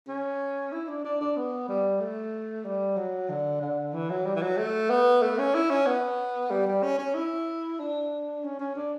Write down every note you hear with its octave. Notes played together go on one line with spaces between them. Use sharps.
C#4
E4
D4
D4
D4
B3
G3
A3
G3
F#3
D3
D3
E3
F#3
G3
E3
F#3
A3
B3
A3
C#4
E4
C#4
B3
G3
G3
C#4
C#4
E4
D4
C#4
C#4
D4